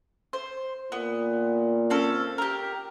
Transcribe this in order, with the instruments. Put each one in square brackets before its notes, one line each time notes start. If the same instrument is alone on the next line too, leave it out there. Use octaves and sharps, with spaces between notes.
[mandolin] C5
[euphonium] A#2 [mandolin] B3
[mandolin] C4 C#4 A4
G4 A#4